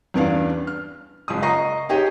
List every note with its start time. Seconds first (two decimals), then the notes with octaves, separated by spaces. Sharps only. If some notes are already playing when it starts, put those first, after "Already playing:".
0.14 E2 G2 B3 C#4 D4 F5
0.67 F6
1.28 F#1 G#3 F4 D#6
1.43 D#5 A#5 C#6 A#6 C7
1.89 D#4 G4 G#4 C#5 D#5